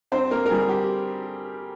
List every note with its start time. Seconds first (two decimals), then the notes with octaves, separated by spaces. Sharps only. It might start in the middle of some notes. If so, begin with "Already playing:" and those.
0.12 G2 C4 C5
0.31 A#3 A#4
0.46 A#4
0.50 D3 G3 A#3 G#4
0.69 G4